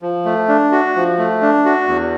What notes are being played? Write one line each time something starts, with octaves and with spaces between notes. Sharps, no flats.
F3
A3
D4
F#4
F3
A3
D4
F#4
E2